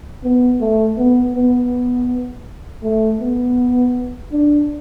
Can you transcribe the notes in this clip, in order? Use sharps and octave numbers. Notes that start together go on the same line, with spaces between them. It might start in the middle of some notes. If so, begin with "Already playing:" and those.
B3
A3
B3
B3
A3
B3
D4